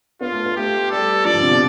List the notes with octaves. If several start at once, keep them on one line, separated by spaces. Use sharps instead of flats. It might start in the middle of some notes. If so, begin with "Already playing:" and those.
B3 F4
A3
B3
A3 G4
G3 A4
F3 D5
D3
C3
B2